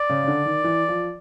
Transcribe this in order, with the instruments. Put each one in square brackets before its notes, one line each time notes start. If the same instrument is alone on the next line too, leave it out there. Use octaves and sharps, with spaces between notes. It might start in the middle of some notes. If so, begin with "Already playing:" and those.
Already playing: [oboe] D5
[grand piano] C#3
C#3
D3
D#3
E3
F3